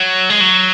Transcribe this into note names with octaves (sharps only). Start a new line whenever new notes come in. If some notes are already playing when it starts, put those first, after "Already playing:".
Already playing: F#3
G#3
F#3